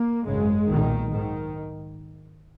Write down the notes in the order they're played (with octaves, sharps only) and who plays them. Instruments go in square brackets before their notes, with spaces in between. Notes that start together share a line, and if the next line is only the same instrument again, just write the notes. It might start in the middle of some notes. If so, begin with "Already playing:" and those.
Already playing: [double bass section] A#3
G#1 F#2 C#3 G#3
B1 A#2 D#3
G#2 D#3